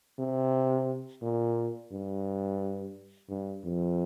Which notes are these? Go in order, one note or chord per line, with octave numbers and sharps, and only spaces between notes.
C3
A#2
G2
G2
F2